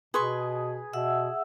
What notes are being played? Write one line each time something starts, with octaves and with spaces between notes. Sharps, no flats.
B2 G#4 B4 C6 C#6
B2 E5 F#5 E6